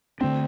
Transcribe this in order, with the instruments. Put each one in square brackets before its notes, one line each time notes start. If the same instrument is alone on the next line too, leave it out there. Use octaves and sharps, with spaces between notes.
[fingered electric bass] D3 A3 D4 [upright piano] C4